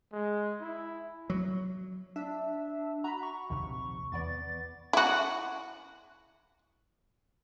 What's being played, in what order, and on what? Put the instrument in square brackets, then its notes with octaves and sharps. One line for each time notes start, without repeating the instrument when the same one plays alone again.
[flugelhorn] G#3
E4
[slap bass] F#3
[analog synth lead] D4 [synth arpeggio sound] E5
[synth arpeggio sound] F#4 B5 [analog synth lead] A#5
[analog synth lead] C#6
[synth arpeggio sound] A#1 D#2 C3
[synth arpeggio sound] E2 B3 D5 [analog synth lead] A6
[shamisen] E4 F#4